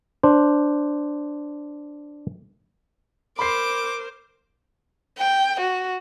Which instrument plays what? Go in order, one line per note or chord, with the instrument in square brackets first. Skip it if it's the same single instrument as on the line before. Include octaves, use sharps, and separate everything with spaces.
[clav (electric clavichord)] D4 C5
[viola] A#4 C5 [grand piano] B5 C6 C7 [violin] D6
[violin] G5
F#4